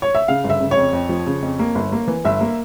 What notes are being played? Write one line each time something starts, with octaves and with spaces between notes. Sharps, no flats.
C#5
E5
C#3 F5
G1
E5
C#3
C#5
F2
F2
F3
C#3
F2
A#3
G1
A#3
E3
G1 E5
A#3